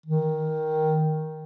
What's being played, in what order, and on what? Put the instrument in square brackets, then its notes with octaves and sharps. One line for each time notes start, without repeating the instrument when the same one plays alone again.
[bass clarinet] D#3